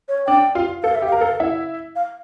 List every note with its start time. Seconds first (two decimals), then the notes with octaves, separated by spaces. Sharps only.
0.08 C#5
0.27 D4 D5 G5
0.55 F4 F5
0.83 A4 F5
0.95 E5
1.02 G4
1.06 F5
1.12 A#4
1.21 A4
1.40 E4 E5
1.96 F5